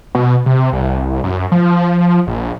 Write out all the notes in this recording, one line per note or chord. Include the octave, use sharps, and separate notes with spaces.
B2
C3
C2
F#2
F3
A#1